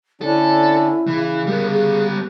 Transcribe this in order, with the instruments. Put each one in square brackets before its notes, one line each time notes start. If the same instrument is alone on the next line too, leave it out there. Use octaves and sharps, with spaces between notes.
[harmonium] D3 C#4 D4 [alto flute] E4 [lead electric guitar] A4
[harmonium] C#3 [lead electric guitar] E3
[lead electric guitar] G3 B3 [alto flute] A#4
[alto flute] G#4